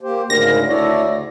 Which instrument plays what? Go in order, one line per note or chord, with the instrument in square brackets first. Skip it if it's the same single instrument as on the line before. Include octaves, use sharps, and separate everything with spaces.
[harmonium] A#3 G4 C5
[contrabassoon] D2 [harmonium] G#2 C#3 [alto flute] A#4 [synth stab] A#6
[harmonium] A3 C#5 D5 [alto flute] E4
[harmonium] C#3